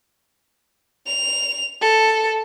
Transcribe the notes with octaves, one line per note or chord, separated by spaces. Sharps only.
F7
A4